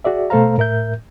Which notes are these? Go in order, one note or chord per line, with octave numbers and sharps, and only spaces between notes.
F#4 G#4 D5 E5
B2 A3 A4 C5 F5 A#5
A2 A#4 E5 G6